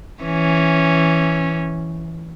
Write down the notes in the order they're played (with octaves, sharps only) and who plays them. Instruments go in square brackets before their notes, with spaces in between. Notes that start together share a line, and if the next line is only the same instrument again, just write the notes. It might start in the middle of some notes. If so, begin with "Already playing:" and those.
[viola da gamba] E3 C#4